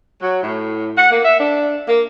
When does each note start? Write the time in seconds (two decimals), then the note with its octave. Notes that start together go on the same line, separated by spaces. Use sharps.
0.22 F#3
0.43 A2
0.98 F#5
1.11 A#3
1.25 E5
1.40 D4
1.88 A#3